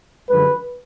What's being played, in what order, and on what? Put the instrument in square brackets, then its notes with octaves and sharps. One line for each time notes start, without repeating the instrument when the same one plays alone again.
[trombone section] F#2 D3 F3 G#3 B4